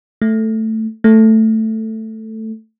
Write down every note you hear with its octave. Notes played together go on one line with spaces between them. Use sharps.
A3
A3